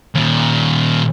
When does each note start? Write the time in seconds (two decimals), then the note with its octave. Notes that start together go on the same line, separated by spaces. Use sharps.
0.15 D#2 A#2